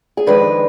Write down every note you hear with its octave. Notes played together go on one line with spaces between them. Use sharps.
G#4
F2 D#3 G#3 D4 B4